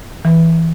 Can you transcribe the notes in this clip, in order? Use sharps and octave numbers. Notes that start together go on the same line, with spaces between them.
E3